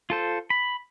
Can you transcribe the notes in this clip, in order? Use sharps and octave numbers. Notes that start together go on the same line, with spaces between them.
F4 A4 C5
B5